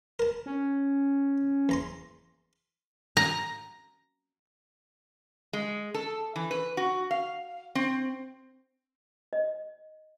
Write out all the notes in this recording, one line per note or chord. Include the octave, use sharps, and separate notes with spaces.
A#4 A5
C#4
E2 A#5 C6
A#5
G#3
A4
E3
B4
F#4
F5
C4
D#5